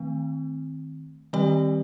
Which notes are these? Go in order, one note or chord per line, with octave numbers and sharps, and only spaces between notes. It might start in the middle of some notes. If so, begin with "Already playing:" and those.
Already playing: D#3 A3 C4
D#3 G3 C4 G4 D5